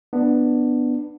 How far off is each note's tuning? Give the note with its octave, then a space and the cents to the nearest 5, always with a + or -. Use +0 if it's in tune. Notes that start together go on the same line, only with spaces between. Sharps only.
B3 +0 D4 +15